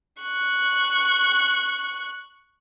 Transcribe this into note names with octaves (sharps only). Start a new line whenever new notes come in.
C#6 F#6